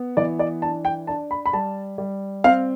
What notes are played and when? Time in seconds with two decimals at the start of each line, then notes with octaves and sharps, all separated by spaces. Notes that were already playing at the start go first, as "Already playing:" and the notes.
Already playing: B3
0.17 E3 D5
0.39 D5
0.62 D4 A5
0.85 G5
1.07 D4 A5
1.31 B5
1.46 B5
1.53 G3 A5
1.98 G3
2.44 C4 F5